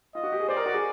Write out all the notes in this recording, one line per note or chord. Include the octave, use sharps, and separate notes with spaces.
F4 D#5
F#4
G4
G#4
C5 D5
A#4
F#4
G#4